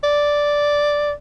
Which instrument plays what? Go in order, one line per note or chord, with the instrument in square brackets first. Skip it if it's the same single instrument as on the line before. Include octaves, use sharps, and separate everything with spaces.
[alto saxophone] D5